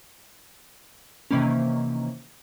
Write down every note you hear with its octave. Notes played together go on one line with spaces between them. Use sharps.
C3 D#3 E3 A#3 C#4